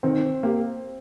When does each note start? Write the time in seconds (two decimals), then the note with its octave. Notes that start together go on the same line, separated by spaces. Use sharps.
0.03 D#3 C4
0.43 A#3 G4